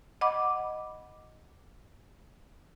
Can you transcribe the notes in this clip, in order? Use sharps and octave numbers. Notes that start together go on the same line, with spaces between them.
D#5 F#5 B5 D6